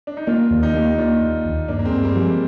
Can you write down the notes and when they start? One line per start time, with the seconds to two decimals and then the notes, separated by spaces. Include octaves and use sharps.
0.07 D4
0.17 D#4
0.27 A#3 D4 F4
0.51 D#2
0.63 D#4 G4
0.75 A#3
0.98 A#3 D4 F4
1.21 D#2
1.45 D#2
1.68 G2 A#3 D4
1.79 A#3
1.85 G#3 C4
1.92 G2
2.03 G3 A#3
2.16 F3
2.21 G#3